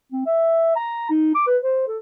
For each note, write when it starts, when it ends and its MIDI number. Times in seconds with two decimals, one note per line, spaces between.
0.12 0.23 60
0.26 0.74 76
0.76 1.06 82
1.10 1.32 63
1.35 1.42 86
1.47 1.57 71
1.64 1.85 72
1.88 1.99 69